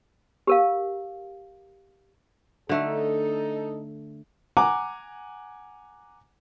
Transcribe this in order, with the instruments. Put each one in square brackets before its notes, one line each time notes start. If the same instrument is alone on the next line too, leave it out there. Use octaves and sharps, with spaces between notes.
[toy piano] G4 A#4 F5
[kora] D3 A3 [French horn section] D#4 A4
[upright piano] F#5 G#5 A#5 D6